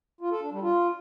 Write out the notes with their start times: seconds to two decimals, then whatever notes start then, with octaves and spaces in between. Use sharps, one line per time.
0.21 F4
0.31 A4
0.41 D4
0.52 G3
0.62 F4